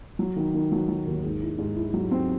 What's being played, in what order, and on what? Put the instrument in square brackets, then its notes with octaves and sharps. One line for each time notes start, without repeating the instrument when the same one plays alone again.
[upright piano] F#3
D#3
D#3
F#3
F#3
D#2
G#2
E4
G#2
E4
F#3
C4